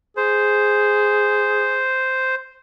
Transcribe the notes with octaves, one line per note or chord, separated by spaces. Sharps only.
G#4 C5